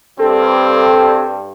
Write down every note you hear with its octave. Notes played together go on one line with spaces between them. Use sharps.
G2 C4 A4